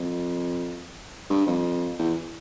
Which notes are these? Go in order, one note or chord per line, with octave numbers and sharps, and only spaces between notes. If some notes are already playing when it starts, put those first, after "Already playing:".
Already playing: F2
G2
F2
E2